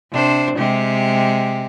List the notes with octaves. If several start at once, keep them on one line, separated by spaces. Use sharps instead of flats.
C3 D4 C5
C3 G#3 G4